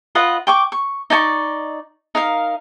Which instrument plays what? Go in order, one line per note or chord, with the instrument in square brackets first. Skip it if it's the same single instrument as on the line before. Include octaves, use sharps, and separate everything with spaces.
[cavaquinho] F4 B4 D#5 F#5
G5 C#6 D6
C#6
D#4 D5 G#5 C#6
D#4 A#4 F5